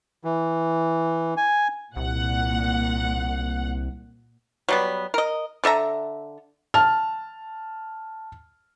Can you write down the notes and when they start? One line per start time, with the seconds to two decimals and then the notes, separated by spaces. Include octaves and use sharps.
0.24 E3
1.37 G#5
1.96 C2 A#2 F#5
4.69 F#3 G3 B3
5.14 A#4 D#5
5.64 D3 A4 E5 A#5
6.74 A5 F6